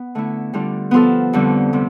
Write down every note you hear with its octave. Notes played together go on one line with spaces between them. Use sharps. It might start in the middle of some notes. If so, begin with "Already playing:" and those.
Already playing: B3
D3 A3 E4
D3 G3 D4 F4
F3 B3 F4 A4
F2 D3 G3
C3 G3